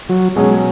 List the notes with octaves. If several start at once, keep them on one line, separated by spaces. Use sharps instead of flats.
F#3
B2 F#3 G#3 C#4 G#4 C#5